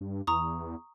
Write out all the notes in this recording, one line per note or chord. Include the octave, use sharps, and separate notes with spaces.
G2
E2 A#5 C#6 D#6